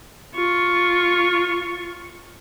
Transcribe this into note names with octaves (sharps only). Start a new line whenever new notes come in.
F4 C#6